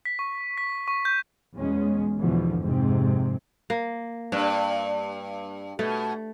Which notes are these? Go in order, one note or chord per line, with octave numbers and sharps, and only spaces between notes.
B6
C#6
B6
C#6
G6
E2 B2 G#3 B3 C#4
E2 B2 D3 E3 F3
F2 G#2 C3 C4
A#3
G2 D4
B2 A3